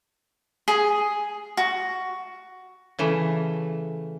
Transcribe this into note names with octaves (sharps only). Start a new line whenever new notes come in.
G#4
F#4
C#3 E3 A3